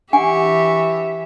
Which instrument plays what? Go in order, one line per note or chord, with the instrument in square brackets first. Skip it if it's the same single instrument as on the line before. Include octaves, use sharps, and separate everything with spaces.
[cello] E3 E5 [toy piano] D4 F#5 G#5 [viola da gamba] G4 [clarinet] C#6